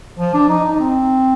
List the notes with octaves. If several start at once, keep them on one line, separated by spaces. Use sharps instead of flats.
F3
D4
D#4
D#4
C4